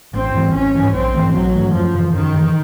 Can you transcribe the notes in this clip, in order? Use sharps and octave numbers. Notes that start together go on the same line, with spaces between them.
A1 C4
G#2 E3 G3
A1 C#4
G#2 E3 G3
A#1 C4
G#2 E3 A3
A#1 F#3
G#2 E3 A3
F#2 F3
C#3 E3
F#2 D#3
C#3 E3